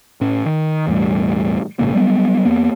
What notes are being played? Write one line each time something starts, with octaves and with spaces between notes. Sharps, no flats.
A2 C#4
D#3
E1 E2 A2 G3
A#1 G#2 C#3 A#3
F#3 G3 B3
E2 A#3 B3